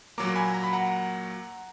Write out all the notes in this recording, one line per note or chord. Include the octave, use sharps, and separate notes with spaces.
A#2 F#3 A#3 A#5 D6
G#5 B5
A#5
B5
F#5 A#5